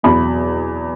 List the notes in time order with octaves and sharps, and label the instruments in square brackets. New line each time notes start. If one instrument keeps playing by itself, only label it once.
[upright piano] E2 B2 F#3 B5